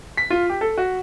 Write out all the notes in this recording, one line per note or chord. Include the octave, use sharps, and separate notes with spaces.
B6
F4
G4
A4
F#4